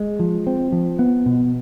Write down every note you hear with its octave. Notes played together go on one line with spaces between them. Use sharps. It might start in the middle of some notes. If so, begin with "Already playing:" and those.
Already playing: G#3
F3
C4
F3
B3
B2